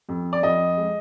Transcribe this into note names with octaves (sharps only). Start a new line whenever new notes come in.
F2
D5
F2 D#5
G#3